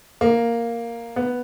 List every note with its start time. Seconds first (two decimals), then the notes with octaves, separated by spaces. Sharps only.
0.21 A#3
1.16 B3